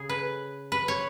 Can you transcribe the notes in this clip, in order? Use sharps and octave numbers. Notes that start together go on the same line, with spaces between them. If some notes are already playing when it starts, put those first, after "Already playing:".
Already playing: C#3 G#4
B4
B4
C#5